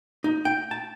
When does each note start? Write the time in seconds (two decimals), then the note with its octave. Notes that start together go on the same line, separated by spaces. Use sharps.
0.24 D#4
0.45 G5
0.71 A5